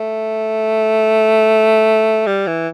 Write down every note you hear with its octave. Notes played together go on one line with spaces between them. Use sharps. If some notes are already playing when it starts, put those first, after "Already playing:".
Already playing: A3
G3
E3